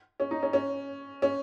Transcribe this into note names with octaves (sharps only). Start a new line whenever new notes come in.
C#4
D#4
C#4
C#4
C#4